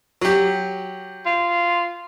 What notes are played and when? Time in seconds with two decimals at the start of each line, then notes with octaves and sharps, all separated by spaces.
0.21 F#3 G4
1.26 F4